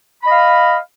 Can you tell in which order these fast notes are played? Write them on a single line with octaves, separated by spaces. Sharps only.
B5 D#5 F5